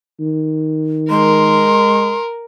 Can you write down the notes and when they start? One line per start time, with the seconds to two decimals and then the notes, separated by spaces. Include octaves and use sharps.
0.20 D#3
1.10 G#3 A#4 C6